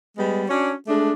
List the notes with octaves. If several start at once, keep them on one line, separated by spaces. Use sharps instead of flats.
G3 G#3 B3
C#4 D4 F#4 C#5
G#3 A3 D4